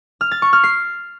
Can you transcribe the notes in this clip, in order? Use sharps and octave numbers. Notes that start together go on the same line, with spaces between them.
F6
A6
C#6
F6
C7